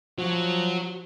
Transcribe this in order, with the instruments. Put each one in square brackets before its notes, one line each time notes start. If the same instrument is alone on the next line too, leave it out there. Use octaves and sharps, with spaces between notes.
[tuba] F3 [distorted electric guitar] F#3